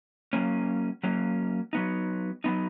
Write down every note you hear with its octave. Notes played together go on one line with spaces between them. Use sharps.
F#3 A#3 C#4
F#3 A#3 C#4
F#3 B3 D#4
F#3 B3 D#4